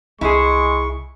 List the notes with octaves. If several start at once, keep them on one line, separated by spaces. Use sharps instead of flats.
C2 G#3 E4 G#4 C#6